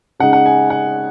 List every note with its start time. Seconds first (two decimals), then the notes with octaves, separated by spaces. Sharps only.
0.19 C#3 G#3 D#4 F#5
0.33 F#5
0.46 G#5
0.70 F#5